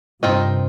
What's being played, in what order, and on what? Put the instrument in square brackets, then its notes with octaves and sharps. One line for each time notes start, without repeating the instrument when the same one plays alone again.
[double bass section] G2 C3 [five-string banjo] D#3 C4 F4 D#5